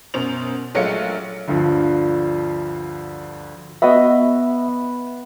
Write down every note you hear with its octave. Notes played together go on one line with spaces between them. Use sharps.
F#2 B2 C5 F7
A#1 F#3 G#3 A3 F5 C#7
D2 G2 F3
B3 F#4 D#5 E5